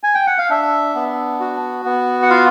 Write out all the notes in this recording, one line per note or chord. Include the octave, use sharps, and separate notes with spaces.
G#5
G5
F#5
F5
D4 E5
B3
F#4
B3
F#5
F4 F5